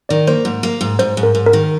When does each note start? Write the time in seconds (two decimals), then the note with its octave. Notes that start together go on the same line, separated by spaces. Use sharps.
0.09 D#3 D5
0.27 A#3 C5
0.45 G#2
0.63 A#3
0.81 G#2
0.99 G#2 C5
1.17 G#2
1.23 A#4
1.35 G#2
1.46 A#4
1.53 D#3